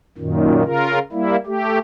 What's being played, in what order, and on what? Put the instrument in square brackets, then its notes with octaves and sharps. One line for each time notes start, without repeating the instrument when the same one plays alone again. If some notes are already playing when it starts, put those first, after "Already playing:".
[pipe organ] F#2 A#2 D#3
C#3 F4 A#4
G3 A#3 E4
A3 G4